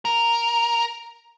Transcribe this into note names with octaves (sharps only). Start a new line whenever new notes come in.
A#4